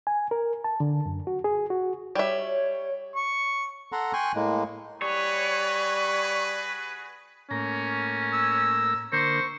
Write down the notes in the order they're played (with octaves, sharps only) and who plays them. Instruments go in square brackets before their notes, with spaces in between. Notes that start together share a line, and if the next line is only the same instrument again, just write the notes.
[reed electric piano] G#5
A#4
A5
D3
F#2
F#4
G#4
F#4
[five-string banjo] G3 E5 [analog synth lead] C#5
[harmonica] C#6
[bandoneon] A4 F#5 A#5 C6
G5 G#5 C6 C#6 F#6
A2 G#3 A#3
[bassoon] G3 [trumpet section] F#4 G#4 B4 [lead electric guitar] C#5
[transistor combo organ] A2 A#3 A#5 [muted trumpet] C#4
[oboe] E6
[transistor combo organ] D3 A#3 A#4 [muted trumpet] C5 [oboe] C#6